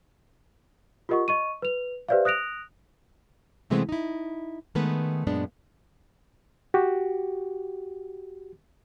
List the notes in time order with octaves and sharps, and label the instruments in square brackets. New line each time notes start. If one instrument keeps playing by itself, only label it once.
[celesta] F4 G4 A#4 D#5 F#5 C#6
D#5 C#6 D#7
B4 F7
G4 B4 C5 D5 E5 F5
D#6 F#6 A#6 D7 F7
[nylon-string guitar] C3 E3 G#3 A3 B3 C4
D#4 E4
D#3 G#3 A3 B3 B4
F#2 A#2 G#3 B3 D4
[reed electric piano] F#4 G4